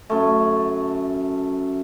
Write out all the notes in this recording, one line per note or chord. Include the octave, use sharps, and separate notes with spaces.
F#2 A3